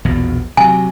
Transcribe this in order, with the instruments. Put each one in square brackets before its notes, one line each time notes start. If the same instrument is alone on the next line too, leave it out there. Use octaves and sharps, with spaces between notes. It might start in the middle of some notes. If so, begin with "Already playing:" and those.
[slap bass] A#1 E2 B2
[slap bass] C3 F#3 [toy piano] G#5